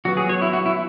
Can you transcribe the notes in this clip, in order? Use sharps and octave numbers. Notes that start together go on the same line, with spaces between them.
F#3 B3 F#4
G#4
C#5
E4
F#4
E4